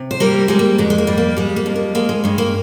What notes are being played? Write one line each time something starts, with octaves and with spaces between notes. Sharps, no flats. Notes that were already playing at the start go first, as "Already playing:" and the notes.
Already playing: C3
C5
G3 A#3 A#4
G3 G#3
A#3
F2 G#3
G#3
A#3
G3
A#3
G3 G#3
A#3
F2
A#3
G#3 A#3
G#3
G2 G#3
A#3